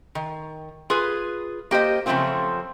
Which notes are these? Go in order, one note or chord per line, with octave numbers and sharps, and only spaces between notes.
D#3
F4 G#4 B4
A#3 G4 C5 D#5
F#2 C#3 F3 A3 C4 F4